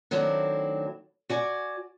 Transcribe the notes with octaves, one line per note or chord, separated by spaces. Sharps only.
D#3 F#3 A3 C4 D4 E4
F#4 D5 G#5